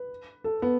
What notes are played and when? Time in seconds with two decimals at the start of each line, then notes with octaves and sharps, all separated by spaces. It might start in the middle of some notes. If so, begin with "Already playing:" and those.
Already playing: B4
0.44 A4
0.62 B3